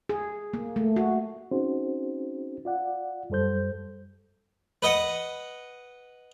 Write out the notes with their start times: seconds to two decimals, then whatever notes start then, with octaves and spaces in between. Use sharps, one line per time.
0.09 G#4
0.54 A#3
0.76 A3
0.96 F#4
1.51 C4 C#4 D#4 F#4 G#4 C5
2.65 F4 D5 F#5
3.30 F#2 G3 A4 C5 G6
4.82 B4 D#5 F#5